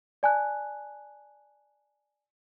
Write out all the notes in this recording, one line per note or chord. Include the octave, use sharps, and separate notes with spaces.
D5 G#5 A5 F#6